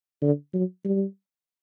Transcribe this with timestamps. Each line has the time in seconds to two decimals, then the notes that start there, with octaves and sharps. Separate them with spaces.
0.22 D3
0.54 F#3
0.85 G3